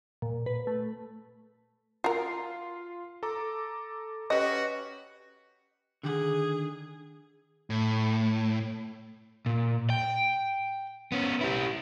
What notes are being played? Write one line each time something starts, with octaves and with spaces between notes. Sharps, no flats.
A#2
B4
A3
F4 F#4 A#4 C7
A4 A#5 D6
C#4 F#4 G4 B4 D#5
D3 D#3 G#4 F#5
A2
A#2
G5
B3 C#4
E4 G4